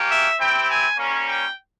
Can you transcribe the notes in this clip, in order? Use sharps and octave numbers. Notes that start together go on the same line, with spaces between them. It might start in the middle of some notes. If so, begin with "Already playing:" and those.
Already playing: A#3 C#4 G4
E5
C4 E4 G4 G5
G#5
G3 A#3 C#4
G5